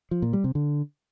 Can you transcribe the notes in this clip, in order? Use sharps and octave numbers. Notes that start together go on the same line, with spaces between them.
F3
A#2
G3
C3
D3